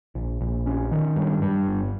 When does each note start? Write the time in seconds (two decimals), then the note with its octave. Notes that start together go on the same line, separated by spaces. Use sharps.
0.15 A#1
0.41 A#1
0.66 C#4
0.92 D#3
1.16 G2
1.42 G2
1.68 G1